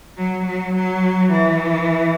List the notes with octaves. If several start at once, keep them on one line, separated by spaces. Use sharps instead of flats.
F#3
F#3
F#3
E3